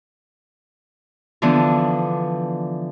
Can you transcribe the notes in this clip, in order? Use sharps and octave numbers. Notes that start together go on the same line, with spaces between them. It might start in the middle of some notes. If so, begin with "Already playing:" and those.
D3 E3 F3 B3 D4